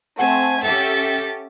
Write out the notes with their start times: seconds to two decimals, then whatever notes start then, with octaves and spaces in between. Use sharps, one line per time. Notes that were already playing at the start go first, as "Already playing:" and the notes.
0.19 A3 C4 F#5 G#5
0.63 C#4 G4 A4 E5 G5 A6